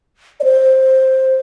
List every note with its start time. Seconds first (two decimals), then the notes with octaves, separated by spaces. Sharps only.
0.40 D5
0.44 C5